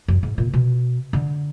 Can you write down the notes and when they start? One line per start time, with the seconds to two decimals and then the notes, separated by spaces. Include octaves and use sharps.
0.08 F#2
0.23 G#2
0.38 A#2
0.54 B2
1.13 D3